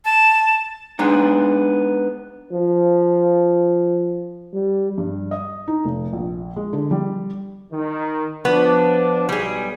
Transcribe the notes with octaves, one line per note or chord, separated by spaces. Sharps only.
A5
G#3 B3 D4 D#4
F3
G3
G2
D#5
D#4
F1
A#1
G#3
D3
G3
D#3
F3 B3 D4
B1 G3 G#4